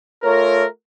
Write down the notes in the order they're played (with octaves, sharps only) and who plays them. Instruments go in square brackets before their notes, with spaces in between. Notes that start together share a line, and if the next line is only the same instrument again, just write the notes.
[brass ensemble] A3 F4 A#4 [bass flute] C#5